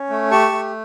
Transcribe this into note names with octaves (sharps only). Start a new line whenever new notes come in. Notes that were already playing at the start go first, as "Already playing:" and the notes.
Already playing: C#4
A3
G4 A5 C#6
A3